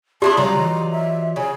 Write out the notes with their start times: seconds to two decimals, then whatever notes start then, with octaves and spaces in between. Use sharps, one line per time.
0.22 D4 E4 G4 G#4 D5 A5 C6
0.37 C#3 F#3 G3 F4 G#4 D5 A#5
0.59 E3 D#5
0.92 E5
1.36 C#3 G#5